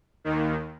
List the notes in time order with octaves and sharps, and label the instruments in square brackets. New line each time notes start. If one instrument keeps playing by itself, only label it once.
[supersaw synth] D#2 D#3